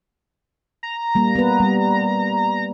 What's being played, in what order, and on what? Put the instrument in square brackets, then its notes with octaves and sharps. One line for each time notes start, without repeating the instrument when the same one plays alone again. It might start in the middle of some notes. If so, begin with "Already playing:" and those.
[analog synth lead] A#5
[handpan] G3 A#3
B3 B4
G3